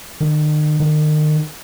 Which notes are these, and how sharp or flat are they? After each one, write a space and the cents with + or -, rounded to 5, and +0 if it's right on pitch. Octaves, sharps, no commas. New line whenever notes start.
D#3 -45
D#3 -35